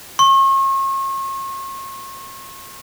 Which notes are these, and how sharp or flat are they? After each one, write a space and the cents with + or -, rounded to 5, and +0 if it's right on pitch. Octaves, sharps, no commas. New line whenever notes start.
C#6 -40